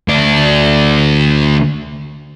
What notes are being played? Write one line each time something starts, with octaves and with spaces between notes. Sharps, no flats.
D2 D5